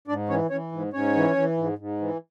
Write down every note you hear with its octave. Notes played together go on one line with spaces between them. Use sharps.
G#2 D4 D5
E3 C#4 C#5
E3 C#4 C#5
G#2
G#2 C#4 C#5
E3
E3
G#2
G#2
E3